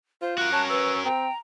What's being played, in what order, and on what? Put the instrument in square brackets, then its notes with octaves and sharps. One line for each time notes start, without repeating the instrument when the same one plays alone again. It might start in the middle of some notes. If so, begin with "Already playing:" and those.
[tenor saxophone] F4 [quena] C5
[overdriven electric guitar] F#4 A#4 [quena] F#6
[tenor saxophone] C#4 [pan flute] A5
[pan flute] B4 [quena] E6
[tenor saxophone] C4 [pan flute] G5 [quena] A#5